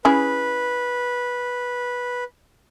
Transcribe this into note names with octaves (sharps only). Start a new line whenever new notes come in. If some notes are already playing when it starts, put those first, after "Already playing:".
C#4 E4 G#4 B4